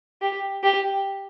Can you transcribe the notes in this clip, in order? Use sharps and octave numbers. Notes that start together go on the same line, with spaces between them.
G4
G4